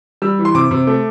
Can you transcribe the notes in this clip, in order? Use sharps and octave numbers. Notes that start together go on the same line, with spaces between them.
G3 E6
E3
C6
C3 D6
C3
A3